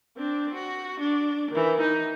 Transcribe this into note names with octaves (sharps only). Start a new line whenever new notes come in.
C4 D4
F#4
D4
D#3 E3
D#4